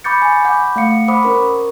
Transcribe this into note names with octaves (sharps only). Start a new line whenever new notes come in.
B5 C#6 D6 G6 A6 C#7
G#5
F#5 B5 C#6 D6 G6
A3 F5 F#5 C#7
C5 F#5 B5 D6 D#6
C#4 A#4 C#6